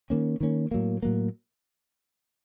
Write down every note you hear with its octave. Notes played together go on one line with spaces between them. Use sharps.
D#3 A#3 C#4
D#3 A#3 C#4
A2 F#3 A#3
A2 F#3 A#3